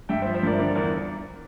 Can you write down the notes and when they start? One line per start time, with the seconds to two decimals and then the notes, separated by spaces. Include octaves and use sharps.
0.09 G2 E5 G5
0.22 C5 E5
0.26 F3
0.35 C5 E5
0.43 G2 A#4 D5
0.58 D3 A#4 D5
0.75 E2 A#4 D5